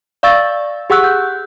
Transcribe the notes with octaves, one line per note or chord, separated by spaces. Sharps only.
D5 F5 C#6 E6 A6
G4 G#4 F#5 C#6 E6 F#6
G6